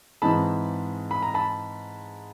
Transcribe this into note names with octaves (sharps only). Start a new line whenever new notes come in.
G#2 E3 G#3 C4 A5 B5
B5
A#5
A5 B5